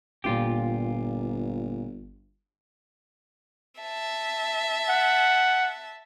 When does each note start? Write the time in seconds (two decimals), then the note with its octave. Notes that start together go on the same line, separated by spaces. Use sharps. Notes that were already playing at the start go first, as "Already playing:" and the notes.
0.24 G1 A#2 F4 G4
3.81 E5 A5
4.89 F#5